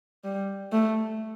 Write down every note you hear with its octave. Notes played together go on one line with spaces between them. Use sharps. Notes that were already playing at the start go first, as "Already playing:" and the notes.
G3
A3